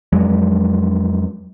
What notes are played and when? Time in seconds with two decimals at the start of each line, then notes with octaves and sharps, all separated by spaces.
0.12 F2 F#3 G#3